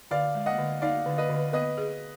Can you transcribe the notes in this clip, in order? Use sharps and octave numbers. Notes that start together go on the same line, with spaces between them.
D3 D5 F5
G#3
D#5 F#5
D3
D#4 D5 F5
D3
B4 D#5
D3
B3 B4 D#5
G#4